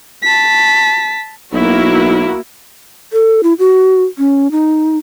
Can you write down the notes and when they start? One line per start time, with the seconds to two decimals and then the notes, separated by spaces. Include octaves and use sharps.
0.23 A5 B6
1.53 B1 A#3 E4 F#4
3.13 A4
3.43 E4
3.59 F#4
4.18 C#4
4.51 D#4